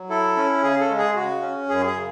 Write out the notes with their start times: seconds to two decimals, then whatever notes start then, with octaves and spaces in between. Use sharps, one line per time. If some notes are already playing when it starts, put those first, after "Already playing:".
Already playing: F#3
0.10 E4 A4
0.36 C#4
0.63 C#3 G#4
0.80 A4
0.89 G#3
0.98 G#4
1.16 C#3 F#4
1.42 C#4
1.69 F#2 G#4
1.86 G#4
1.95 C#3